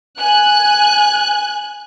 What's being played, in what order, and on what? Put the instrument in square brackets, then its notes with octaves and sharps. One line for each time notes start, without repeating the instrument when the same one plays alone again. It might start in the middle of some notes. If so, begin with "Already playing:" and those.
[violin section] G#5 F#6